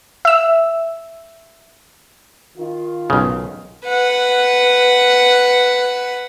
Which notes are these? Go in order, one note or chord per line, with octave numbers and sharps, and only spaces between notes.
E5 E6
D#3 F4
B1 C#3
B4 F#5